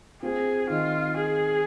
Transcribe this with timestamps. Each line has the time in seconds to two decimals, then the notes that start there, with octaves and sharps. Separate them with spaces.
0.23 C4 F4 G#4
0.70 D#3 F4
1.17 G#4